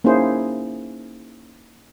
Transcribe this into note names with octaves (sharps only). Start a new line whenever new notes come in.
A#3 C#4 D#4 E4 G#4 C5